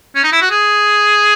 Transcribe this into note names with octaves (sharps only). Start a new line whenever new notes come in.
C#4
D#4
E4
F#4
G#4